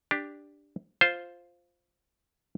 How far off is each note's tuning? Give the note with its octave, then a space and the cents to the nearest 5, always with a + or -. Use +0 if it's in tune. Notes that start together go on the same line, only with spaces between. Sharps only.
D4 +0 G4 +10
F4 +0 C5 +0